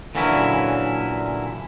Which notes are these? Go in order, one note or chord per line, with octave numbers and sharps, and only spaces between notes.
A#2 D3 E3 F#3 C#4 E4